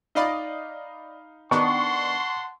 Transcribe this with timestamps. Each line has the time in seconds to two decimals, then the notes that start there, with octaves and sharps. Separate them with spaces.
0.15 D#4 D5 D#5 F5 B5
1.51 D#3 B3 D4 F#5 A5 C6 C#6